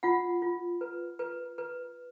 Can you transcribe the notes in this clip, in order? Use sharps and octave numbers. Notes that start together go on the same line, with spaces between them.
F4 F#5
F4
B4
B4
B4